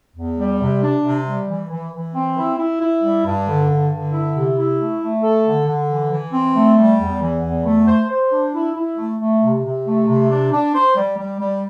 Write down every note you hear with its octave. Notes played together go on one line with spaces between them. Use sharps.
E2
G3
C3
D4
C3
G3
E3
E3
E3
C4
E4
E4
E4
G3
G2
D3
G2
D3
E4
C3
E4
A3
A3
A4
D3
D3
E3
E3
C4
A3
G3
E2
E3
E2
A3
C5
C5
D4
E4
E4
A3
A3
C3
C3
A3
C3
D4
D4
C5
G3
G3
G3